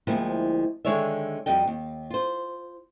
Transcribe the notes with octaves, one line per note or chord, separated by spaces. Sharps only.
D2 F3 G#3 A#3 C4 E4
D3 D#3 G#3 C#5 D5 E5
F2 G3 F#4 D#5 G5
D#2
F4 C5